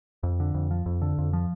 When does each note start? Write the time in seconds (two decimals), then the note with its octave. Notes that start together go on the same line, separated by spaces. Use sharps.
0.23 F2
0.40 D3
0.54 F2
0.71 F3
0.86 F2
1.02 D3
1.18 F2
1.33 F3